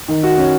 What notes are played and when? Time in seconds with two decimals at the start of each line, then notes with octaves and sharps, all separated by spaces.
0.08 D#3
0.23 F#4
0.38 C#4